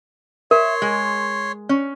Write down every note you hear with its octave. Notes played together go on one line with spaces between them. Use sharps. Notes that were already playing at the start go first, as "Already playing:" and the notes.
A#4 C#5 E5 C6
G#3
C#4